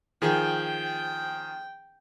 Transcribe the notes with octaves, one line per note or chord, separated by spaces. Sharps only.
D#3 F3 G#4 G5